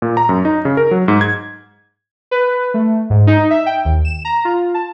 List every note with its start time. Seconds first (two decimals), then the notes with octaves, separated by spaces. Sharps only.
0.02 A#2
0.17 A#5
0.29 F#2
0.45 D#4
0.65 C#3
0.77 A#4
0.91 F#3
1.08 G#2
1.21 G#6
2.31 B4
2.74 A3
3.10 G#2
3.27 D#4
3.50 E5
3.66 G5
3.85 D#2
4.05 E7
4.25 A#5
4.45 F4
4.74 A5